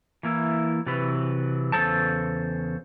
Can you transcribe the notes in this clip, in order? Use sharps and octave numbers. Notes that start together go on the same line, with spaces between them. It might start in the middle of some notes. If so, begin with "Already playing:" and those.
E3 A#3 E4
C3 E3 F#3 B4
E2 C#3 F3 A4 C5 A5